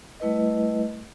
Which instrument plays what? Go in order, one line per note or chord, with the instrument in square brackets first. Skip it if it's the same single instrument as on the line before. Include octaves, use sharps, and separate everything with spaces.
[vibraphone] G3 A3 E4 B4 D#5